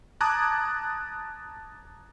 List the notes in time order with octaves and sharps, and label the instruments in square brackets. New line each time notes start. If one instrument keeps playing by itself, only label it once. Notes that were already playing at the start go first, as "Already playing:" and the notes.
[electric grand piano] A5 A#5 D6 D#6 F#6 G#6